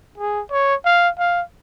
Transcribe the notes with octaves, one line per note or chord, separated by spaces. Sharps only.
G#4
C#5
F5
F5